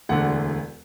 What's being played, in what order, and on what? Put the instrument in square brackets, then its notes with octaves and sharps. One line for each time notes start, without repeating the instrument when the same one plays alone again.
[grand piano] E1 D2 D3 F#5